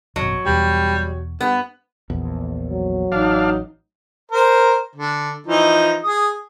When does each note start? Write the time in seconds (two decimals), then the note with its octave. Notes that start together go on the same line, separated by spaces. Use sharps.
0.16 G#1 F#2 B2 F#3
0.46 E1 E2 G3
1.41 G2 B3
2.10 A#1 E2
2.68 F#3
3.12 A1 D4 D#4 F5
4.31 A#4 C5
4.96 D3
5.47 E3 F3 D#4
6.04 G#4 D#6